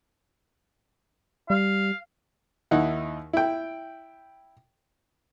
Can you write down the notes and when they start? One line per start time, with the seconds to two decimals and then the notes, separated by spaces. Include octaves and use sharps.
1.50 G3 F5
2.71 D#2 D#4 E4 F#5
3.33 E4 G5